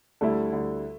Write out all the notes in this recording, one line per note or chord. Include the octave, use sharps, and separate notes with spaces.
D2 D3 G3 A3 E4
D2 D3 G3 E4